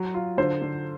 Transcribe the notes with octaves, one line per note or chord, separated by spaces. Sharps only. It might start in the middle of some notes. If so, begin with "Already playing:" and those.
Already playing: F#3
F4
D3 C5
D3